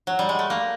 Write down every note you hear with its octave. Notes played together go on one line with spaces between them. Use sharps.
F#3
G3
G#3
A3
A#3